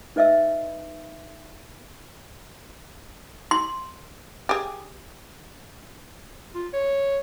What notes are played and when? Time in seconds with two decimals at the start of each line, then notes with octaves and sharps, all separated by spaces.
0.16 D#4 B4 D#5 E5 E6
3.51 C6
4.49 G4 G#4
6.55 F4
6.74 C#5